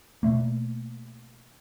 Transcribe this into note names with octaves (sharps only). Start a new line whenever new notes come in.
B2 A3 A#3